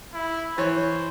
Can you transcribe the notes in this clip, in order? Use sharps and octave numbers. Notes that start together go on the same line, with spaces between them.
E4
E3 C5 C#5